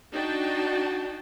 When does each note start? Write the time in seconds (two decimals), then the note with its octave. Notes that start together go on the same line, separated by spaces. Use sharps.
0.14 D4 D#4 F#4 G5 A5